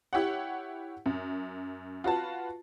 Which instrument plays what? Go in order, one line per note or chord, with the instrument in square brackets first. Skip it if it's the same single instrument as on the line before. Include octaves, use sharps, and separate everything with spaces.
[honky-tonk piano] E4 G4 C#5 F#5
F#2
F4 F#4 B4 A5